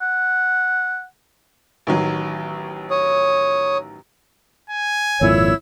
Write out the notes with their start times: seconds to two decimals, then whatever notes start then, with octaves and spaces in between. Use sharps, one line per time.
0.01 F#5
1.87 A1 D#3 F#3
2.90 C#5 D#6
4.69 G#5
5.21 G#1 F2 A#2 E4 C#5 E6